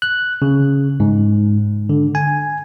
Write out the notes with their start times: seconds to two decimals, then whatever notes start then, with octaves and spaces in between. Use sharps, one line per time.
0.02 F#6
0.42 C#3
1.00 G#2
1.89 D3
2.15 G#5